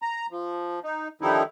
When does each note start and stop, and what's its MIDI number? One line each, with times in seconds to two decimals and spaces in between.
0.02 0.26 82
0.31 0.80 53
0.84 1.08 63
1.21 1.43 50
1.21 1.43 51
1.21 1.43 53
1.21 1.43 55
1.21 1.43 63
1.21 1.43 64